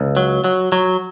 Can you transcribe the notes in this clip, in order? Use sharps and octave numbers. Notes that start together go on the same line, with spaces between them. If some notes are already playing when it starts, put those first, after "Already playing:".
Already playing: C#2
F#3
F#3
F#3